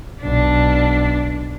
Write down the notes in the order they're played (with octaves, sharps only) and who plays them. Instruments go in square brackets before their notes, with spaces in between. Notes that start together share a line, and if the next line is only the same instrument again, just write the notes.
[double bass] B1 [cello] D4